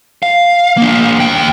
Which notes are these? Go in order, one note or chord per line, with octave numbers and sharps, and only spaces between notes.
F5
A#3 D4
D#2 G5